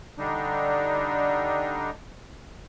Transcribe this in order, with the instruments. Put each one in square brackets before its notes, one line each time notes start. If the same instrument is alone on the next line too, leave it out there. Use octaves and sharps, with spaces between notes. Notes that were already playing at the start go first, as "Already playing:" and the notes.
[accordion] D3 G3 D4 D#4